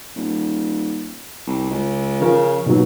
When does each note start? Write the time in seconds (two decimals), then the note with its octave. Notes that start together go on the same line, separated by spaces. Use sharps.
0.16 D#1
1.47 C2
1.70 C#2
2.21 C#3 F3 A#4
2.66 D#2 B2 F#3